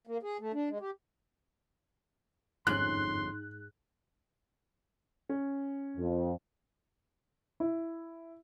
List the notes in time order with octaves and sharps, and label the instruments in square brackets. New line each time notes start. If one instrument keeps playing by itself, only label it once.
[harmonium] A#3
G#4
A3
D4
G#3
G4
[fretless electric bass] G1 F2 C#4 [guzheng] G#2 [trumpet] C6 [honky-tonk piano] F#6
[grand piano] C#4
[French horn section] F2
[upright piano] E4